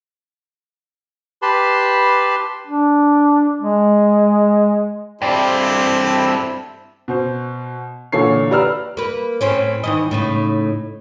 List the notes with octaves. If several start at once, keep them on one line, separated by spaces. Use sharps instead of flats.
G4 B4 A5 B5 C6
D4
G#3
G2 C4 E4 G4 A4 C5 D5
B2 C5
A#2 D3 E3 A4 C#5 C7
G4 B4 D5 A#5 E6 F6
A#3 B4
A2 C4 C#4
D#3 E3 D#5
A2 C#3 D#4